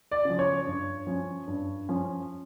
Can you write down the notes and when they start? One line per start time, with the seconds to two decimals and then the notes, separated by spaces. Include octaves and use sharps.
0.11 D5
0.25 C#3 F3
0.39 C#5
0.67 G2
1.07 F3 C#4
1.47 G2
1.89 F3 C#4